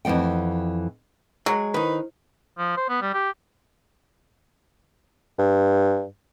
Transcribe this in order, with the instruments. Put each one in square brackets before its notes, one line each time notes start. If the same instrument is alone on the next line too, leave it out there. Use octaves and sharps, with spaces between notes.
[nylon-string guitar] F2 E3 F3 F#5 G5
[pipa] F#3 [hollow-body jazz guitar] G#3
[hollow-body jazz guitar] D#3 D#4 [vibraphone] E4 C5 [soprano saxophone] B4
[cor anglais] F3
C5
B3
G3
G4
[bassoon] G2